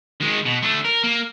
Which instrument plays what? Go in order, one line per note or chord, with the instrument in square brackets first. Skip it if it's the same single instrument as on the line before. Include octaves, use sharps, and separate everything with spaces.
[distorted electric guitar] D#3 G#3
B2
A3 D4
A#4
A#3